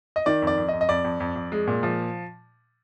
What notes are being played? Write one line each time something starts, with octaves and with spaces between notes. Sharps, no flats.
D#5
D#3 D5
F2
D5
F2
D#5
F2
D#5
F2 D5
F2
F2
F2
G#3
A#2
F3